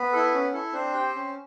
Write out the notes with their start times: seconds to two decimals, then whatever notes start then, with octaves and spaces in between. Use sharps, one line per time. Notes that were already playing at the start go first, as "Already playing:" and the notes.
Already playing: B3 B4
0.13 E4 A4
0.33 C#4
0.53 E4 A4
0.73 C4 D4 C5
0.94 G4
1.15 C#4